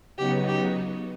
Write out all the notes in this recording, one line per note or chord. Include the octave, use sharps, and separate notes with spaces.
C#3 F#3 B3 D#4 F#4 G4
G4